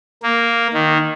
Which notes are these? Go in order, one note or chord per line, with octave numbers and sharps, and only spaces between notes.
A#3
D#3